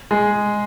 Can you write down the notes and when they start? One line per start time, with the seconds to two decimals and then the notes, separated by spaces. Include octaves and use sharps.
0.11 G#3 G#4